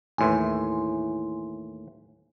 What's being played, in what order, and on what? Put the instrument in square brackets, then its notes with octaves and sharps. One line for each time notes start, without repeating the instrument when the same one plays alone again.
[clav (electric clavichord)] D#2 A2 E3 [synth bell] G#5 C6